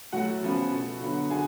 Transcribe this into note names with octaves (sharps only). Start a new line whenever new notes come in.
A2 F#3 A3 F#4 F#5
C#3 F3 B3
B2 A3
D3 F#3 B3
D3 G#3 B3 G#4 G#5